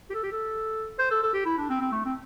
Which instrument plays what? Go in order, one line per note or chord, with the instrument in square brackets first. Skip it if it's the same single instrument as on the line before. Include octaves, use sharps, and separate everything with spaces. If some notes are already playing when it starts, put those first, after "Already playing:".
[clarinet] G4
A4
G4
A4
C5
A4
A4
G4
E4
D4
C4
C4
A3
C4